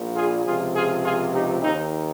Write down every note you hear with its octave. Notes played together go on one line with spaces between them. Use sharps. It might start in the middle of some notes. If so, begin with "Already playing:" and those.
Already playing: A#1 A#2 F3
F4 G#4
C#2 C3 F3 F4 G#4
F4 G#4
F4 G#4
D#4 G4
D#2 D#3 C4 D#4